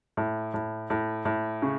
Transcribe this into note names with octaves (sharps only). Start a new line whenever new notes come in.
A2
A2
A2
A2
C#3